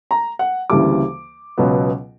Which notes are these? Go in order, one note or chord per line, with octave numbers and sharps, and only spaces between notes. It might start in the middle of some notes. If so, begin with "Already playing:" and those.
A#5
F#5
D2 C#3 E3 G3 A#3 D6
C#2 B2 F#3 B3